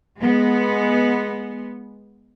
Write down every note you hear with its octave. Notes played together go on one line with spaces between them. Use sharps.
G#3 B3